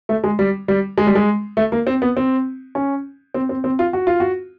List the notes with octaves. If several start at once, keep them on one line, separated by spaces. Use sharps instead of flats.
A3
G#3
G3
G3
G#3
G3
G#3
A3
A#3
C4
B3
C4
C#4
C4
C4
C4
F4
F#4
F4
F#4